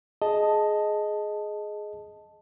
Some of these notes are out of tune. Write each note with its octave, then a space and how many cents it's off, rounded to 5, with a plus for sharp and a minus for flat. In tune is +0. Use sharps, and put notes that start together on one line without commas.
G#4 +15 D#5 +0 A5 +0